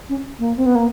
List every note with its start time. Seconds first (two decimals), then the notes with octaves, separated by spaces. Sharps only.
0.09 C#4
0.39 A#3
0.57 C4
0.66 B3
0.75 A#3